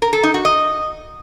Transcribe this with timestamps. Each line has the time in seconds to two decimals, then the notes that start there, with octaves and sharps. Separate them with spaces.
0.02 A#4
0.13 A4
0.23 D#4
0.34 F#4
0.45 D#5